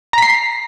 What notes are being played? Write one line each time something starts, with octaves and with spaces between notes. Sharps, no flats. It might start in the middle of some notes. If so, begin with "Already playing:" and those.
A#5 B6 C7